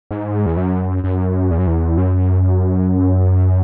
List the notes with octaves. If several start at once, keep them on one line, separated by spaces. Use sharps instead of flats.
G#2
E2
F#2
F#2
E2
F#2
E2
F#2